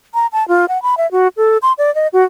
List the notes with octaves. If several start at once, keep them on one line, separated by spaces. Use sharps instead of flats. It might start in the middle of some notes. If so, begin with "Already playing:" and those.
A#5
A5
F4
F#5
B5
E5
F#4
A4
C6
D5
D#5
F#4